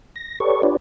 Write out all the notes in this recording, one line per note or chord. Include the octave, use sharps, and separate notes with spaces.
A#6
G4 A4 B4 C#5 D5 C#6
D4 F4 G4 B4 C#5 D5